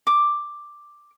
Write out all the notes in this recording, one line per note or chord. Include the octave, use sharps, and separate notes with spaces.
D6